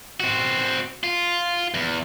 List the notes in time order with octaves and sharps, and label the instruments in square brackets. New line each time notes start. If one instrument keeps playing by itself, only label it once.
[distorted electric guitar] C4 F#4
F4
E2